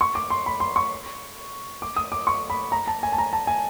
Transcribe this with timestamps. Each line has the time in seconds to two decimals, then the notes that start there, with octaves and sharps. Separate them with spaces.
0.01 C#6
0.15 D6
0.30 C6
0.46 B5
0.60 C6
0.76 C#6
1.82 D6
1.96 D#6
2.12 D6
2.27 C#6
2.50 B5
2.72 A#5
2.87 A5
3.03 G#5
3.13 A5
3.18 A#5
3.33 A5
3.47 G#5